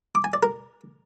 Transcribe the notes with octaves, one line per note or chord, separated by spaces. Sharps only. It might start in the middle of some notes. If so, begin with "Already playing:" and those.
D6
G#5
D5
A#4